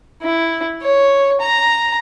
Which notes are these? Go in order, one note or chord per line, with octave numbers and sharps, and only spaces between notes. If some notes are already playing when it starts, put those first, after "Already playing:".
E4
C#5
A#5